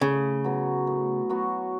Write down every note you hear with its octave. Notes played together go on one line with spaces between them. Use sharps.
A2 C#3
F#3 B3 F#4
A2
F#3 B3 F#4